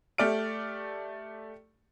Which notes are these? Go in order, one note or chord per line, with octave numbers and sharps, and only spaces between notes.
A3 G4 D5 F6 D7